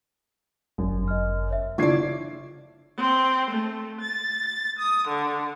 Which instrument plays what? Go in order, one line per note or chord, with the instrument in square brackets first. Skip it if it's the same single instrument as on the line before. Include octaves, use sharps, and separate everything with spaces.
[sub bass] G1 [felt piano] F#2
[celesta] D#5 F6
C#5 E5
[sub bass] C#3 [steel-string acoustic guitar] D4 E4 D5 [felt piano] F4 G#6 C7 [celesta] C#6
[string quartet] C4
A3
A6
D#6
D3